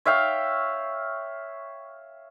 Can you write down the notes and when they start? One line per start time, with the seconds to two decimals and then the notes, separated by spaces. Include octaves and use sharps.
0.05 C#5 E5 F5 G5